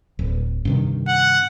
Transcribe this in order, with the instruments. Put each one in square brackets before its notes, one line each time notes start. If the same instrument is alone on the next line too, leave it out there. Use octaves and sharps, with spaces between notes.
[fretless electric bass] D1
G2 C3 D#3
[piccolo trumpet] F#5